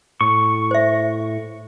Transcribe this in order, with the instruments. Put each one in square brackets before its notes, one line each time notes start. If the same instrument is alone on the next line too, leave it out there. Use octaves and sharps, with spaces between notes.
[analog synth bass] A2 [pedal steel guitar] C#6
[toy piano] C5 E5